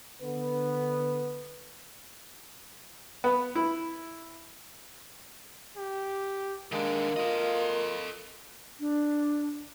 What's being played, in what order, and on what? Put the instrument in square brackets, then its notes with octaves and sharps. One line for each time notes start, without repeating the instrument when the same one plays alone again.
[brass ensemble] D3 B3 B4
[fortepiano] B3
E4
[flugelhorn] G4
[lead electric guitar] D#3 D4 [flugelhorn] G#3 [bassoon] A#3
[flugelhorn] F4 [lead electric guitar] A4 D#5
[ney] D4